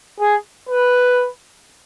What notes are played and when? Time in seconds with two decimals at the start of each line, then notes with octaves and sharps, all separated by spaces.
0.20 G#4
0.69 B4